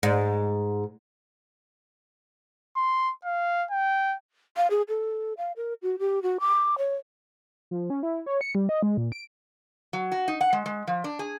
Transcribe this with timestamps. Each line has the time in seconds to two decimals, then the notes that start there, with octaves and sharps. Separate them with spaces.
0.03 G#2
2.77 C6
3.25 F5
3.71 G5
4.57 F5
4.70 G#4
4.88 A4
5.37 F5
5.57 A#4
5.82 F#4
5.99 G4
6.23 F#4
6.40 D6
6.78 C#5
7.71 F3
7.90 C#4
8.03 E4
8.26 C#5
8.41 C#7
8.55 G3
8.69 D#5
8.83 G#3
8.97 A#2
9.12 D7
9.93 F#3
10.12 F#4
10.28 D#4
10.41 F#5
10.53 G#3
10.66 G#3
10.87 F3
11.04 D4
11.19 G#4